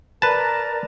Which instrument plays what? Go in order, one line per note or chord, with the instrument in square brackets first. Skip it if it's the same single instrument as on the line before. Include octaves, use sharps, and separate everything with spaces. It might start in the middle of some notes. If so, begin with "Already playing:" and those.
[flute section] A#4 D5 A#5 [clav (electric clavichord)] B4 A5